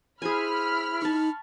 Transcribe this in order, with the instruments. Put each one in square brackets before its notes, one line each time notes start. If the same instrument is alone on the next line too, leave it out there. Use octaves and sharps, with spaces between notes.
[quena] E4 [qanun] G#4 C5 G#5 [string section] B5 F6
[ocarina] D#4 [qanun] A5 C#6